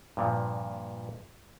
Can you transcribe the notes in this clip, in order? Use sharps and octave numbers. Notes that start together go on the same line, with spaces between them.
G2 A#2 F3